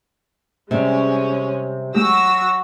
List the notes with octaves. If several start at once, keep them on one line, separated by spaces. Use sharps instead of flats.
C3 G3 G#3 C#4
F#3 G#3 A3 F#4 G4 E6 A#6